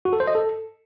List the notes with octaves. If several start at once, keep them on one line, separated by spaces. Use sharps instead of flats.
F#4
A4
C5
D#5
A4